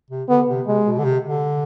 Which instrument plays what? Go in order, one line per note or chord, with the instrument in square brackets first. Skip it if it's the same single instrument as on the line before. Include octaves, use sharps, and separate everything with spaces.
[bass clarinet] C3
[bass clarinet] D3 [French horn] B3
[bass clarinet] C3
[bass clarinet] C3 [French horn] G#3
[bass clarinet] B2
D3
C3
D3